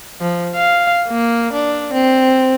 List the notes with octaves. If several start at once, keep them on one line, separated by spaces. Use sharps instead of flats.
F3
F5
A#3
D4
C4